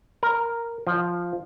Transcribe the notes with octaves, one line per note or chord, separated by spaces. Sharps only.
A#4
F3